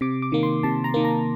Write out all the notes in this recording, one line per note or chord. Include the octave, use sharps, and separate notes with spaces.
C3 D6
D6
D#3 A#3
C6
C3 A5
A#5
D#3 A#3
A#5